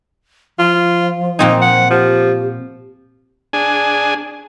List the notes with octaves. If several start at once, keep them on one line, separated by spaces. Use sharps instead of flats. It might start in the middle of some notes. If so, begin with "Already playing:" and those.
F3 F4
A#2 C4 D#4 G#5
F#5
F3 G4
D4 G#4 G#5